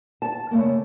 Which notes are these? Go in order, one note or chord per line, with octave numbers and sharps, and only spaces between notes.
A5
C#3 A3 A#3